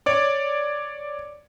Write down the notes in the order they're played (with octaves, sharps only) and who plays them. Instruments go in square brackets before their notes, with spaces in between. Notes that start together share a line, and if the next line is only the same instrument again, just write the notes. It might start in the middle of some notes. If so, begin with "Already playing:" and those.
[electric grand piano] C#5 D5 D6